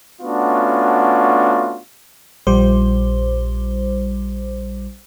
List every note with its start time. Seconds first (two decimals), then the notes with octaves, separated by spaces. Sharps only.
0.21 A3 B3 C#4 D4 F4 F#4
2.47 A#1 G3 C5